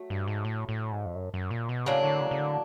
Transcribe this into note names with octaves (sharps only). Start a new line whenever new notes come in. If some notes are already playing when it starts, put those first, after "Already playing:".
Already playing: F#3 A3
G2
G#2
A2
A2
G#2
F2
F#2
F#2
A#2
B2
A2 C#3 F#3 A#3 D4
D3
C#3
C#3
D3